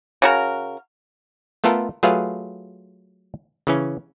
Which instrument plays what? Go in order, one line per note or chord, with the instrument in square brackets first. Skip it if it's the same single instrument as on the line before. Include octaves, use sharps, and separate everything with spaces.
[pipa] C#3 F#4 A#4
[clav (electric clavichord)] A3 B3 F4 A4 A#4
F#3 A3 F4 G#4 B4 F5
C#3 E3 C#4